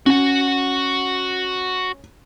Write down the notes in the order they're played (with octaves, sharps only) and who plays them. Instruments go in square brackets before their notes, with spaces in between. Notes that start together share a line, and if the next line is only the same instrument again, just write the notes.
[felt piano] C#4 [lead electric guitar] F#4 F#5